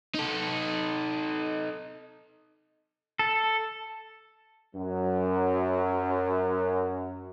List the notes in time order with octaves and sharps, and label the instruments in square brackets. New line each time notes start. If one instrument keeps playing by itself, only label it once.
[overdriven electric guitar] D#4 A4
[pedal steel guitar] A4
[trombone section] F#2 F#3